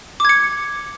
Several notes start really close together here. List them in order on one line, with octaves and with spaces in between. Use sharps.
D6 G#6 C#7